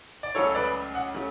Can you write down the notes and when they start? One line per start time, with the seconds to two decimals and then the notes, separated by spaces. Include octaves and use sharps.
0.23 D5
0.35 C#2 C#3 F#3 A3 A4 C#5
0.55 B4 D5
0.95 F#5
1.14 C#3 F#3 A3